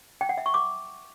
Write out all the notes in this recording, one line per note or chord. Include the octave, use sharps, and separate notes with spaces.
G5
F#5
E5
C#6
D6